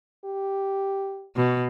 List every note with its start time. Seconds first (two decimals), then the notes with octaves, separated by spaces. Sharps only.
0.25 G4
1.36 B2